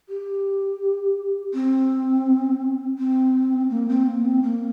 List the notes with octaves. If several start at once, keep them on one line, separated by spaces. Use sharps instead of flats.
G4
C4
C4
A#3
C4
A#3
C4
A#3